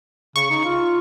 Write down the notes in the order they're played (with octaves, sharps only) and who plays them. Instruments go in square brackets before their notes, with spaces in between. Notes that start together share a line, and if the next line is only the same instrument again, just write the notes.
[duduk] C#3 [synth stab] C#6
[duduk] D#4
F4